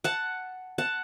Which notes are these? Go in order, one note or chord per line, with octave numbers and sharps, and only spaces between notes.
F#5 A5
F#5 A5